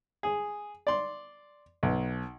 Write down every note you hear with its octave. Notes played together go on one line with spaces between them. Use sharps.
G#4
D5 C6
B1